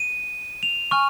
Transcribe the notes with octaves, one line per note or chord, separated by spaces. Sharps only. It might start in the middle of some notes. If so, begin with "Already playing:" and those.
Already playing: D#7
F7
G#5 C#6 F6